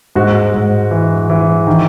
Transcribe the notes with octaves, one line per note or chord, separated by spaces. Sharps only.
G#2 F#4
G#2
E3
E3
D#3